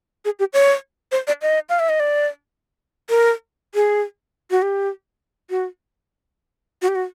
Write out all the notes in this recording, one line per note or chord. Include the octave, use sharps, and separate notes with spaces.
G#4
G4
C#5
C5
D5
D#5
F5
E5
D#5
D5
A#4
G#4
F#4
G4
F#4
F#4
G4
F#4